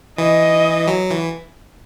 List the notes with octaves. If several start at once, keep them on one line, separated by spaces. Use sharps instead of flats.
E3 D#5
F#3
E3